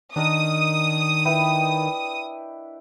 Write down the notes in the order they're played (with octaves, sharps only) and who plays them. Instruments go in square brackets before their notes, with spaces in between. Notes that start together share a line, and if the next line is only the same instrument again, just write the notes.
[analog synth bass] D#3 [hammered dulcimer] D4 A#4 D#5 [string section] D#6
[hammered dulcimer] E4 B4 G5